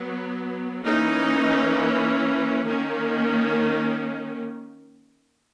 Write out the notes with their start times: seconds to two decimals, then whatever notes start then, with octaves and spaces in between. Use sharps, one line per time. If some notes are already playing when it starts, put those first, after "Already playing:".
Already playing: F#3 B3
0.85 E3 A#3 C#4 D#4
2.65 D#3 A#3 C#4